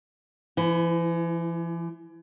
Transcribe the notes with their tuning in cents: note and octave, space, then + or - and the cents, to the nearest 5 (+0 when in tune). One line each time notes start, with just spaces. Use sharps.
E3 +40 E4 +0